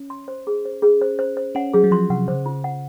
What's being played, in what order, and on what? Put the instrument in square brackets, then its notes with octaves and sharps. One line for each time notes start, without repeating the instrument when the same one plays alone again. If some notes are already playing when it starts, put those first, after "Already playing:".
Already playing: [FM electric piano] C#4
[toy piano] C6
C5
G#4
C5
G#4
C5
C5
C5
[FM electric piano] C#4 [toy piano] F#5
[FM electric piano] F#3 [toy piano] G#4
[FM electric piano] F#3
[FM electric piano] F3 [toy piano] C6
[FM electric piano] C3 [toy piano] F#5
[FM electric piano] C#3 [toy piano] C5
[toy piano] F4
F#5